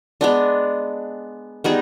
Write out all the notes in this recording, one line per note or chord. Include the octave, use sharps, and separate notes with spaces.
G#3 B3 D4
G3 B3 D#4 G#4